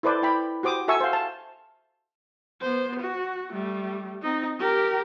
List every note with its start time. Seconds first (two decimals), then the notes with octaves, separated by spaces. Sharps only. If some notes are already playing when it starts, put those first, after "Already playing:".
0.03 E4 A4 B4 C5 D5
0.22 E4 G5 B5
0.63 F#4 G4 C5 D6 D#6
0.88 F#4 A4 E5 G#5 C#6 E6
1.00 C5 F5
1.13 A5
2.61 B3 C5
3.00 F#4
3.52 G3 A3
4.22 C4 D#4
4.59 G4 A#4